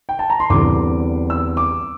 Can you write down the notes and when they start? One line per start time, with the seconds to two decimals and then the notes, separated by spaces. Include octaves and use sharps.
0.09 G5
0.19 A5
0.30 A#5
0.40 C6
0.50 E2 D3 G3 C4 D6
1.30 E6
1.57 D6